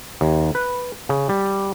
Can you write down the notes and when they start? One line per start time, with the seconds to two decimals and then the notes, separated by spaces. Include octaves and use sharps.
0.21 D#2
0.55 B4
1.09 C#3
1.29 G3